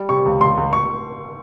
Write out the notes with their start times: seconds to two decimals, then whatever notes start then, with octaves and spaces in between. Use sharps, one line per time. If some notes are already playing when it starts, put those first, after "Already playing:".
Already playing: G3
0.09 C3 C#6
0.25 C#2
0.40 C#2 C6
0.57 C#2
0.73 C#6